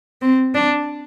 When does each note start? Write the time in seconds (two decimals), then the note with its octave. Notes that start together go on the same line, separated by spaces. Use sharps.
0.22 C4
0.55 D4